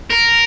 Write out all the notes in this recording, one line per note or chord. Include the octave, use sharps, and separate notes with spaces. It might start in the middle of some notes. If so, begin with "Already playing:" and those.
A#4